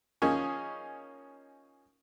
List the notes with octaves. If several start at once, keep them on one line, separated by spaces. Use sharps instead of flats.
F3 A#3 C#4 D#4 G#4 C#5